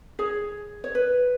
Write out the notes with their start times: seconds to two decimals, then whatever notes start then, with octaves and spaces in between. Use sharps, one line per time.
0.19 G#4 C#5
0.84 C#5
0.95 B4